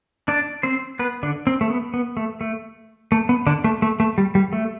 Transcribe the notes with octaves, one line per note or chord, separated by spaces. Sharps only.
D4 D5
C4 C5
B3 B4
D3 D4
C4
A3
B3
B3
A3
A3
A3
B3
D3 D4
A3
A3
A3
G3
G3
A3